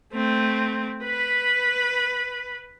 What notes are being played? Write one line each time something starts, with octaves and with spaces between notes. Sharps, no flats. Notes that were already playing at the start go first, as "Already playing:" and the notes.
A3 C4
B4 B5